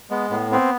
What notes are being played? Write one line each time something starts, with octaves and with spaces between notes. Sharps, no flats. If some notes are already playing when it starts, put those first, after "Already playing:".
G#3 B3
A2 B3
B3 C4